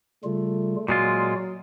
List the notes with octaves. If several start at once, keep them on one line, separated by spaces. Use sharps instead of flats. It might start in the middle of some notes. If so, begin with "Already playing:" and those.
C#3 G3 A3 F4
A#2 F#3 G#3 F4 F#4 D5